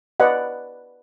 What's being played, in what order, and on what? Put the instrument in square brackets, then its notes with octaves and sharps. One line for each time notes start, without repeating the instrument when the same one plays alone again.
[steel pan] B4 D5 D#5 F#5